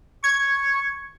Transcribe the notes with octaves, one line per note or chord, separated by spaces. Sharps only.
C#6 G#6